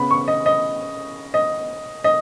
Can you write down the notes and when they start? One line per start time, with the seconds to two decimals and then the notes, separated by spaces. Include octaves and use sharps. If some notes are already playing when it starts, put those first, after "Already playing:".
Already playing: C#3 B3 B5
0.11 C#6
0.28 D#5
0.46 D#5
1.34 D#5
2.04 D#5